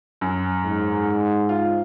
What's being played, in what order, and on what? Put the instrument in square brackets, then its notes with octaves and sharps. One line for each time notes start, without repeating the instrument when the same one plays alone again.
[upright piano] F#2
[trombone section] G#2
[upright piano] F4